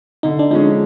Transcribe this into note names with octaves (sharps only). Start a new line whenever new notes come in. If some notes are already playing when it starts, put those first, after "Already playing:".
D3 D#4
D4
F3 G#3 C#4 D#4